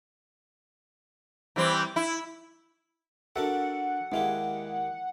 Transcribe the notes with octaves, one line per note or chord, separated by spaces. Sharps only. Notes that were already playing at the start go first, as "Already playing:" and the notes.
E3 G3 C4
E4
D4 F#4 A4 A#4 E5 F#5
D#2 G#3 A#3 E4 G4